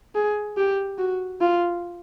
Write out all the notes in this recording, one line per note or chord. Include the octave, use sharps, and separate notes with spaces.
G#4
G4
F#4
F4